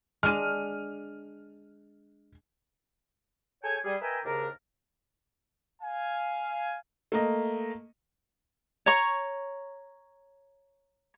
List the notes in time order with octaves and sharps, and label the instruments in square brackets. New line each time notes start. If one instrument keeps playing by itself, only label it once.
[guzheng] G#3 D4 [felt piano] F6 D#7
[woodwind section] G#4 A4 C#5 G5 G#5
G3 G#4
A#4 B4 D#5 E5 G5 G#5
D#2 G#2 C#3 D4 A#4
[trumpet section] F5 G#5
[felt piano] A3 A#3 D#5
[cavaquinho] C#5 A#5 C#6